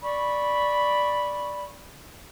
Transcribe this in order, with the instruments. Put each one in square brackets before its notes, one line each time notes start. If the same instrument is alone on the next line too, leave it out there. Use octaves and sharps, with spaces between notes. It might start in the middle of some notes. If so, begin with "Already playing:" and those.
[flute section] D5 B5 C#6